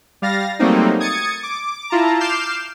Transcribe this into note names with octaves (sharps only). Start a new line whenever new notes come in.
G3 F5 A6 A#6
F#3 G3 A3 A#3 C4 D#4
D#6 G#6 A6 C#7
D6
E4 F4 A5 A#5
D6 F6 G6 C7 E7